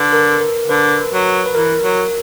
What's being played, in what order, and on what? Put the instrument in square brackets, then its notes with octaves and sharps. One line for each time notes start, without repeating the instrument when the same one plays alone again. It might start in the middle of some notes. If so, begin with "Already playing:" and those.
Already playing: [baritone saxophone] D3 [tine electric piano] B4
[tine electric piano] A#4
A#4
[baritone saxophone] D3 [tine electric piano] B4
[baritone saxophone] F#3
[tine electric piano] B4
[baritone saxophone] E3 [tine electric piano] A#4
[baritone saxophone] F#3